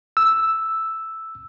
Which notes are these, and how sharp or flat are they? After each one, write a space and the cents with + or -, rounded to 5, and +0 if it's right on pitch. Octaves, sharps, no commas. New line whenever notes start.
E6 +0